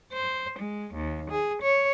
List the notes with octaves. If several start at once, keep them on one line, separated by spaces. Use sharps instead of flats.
C5
G#3
D#2
G#4
C#5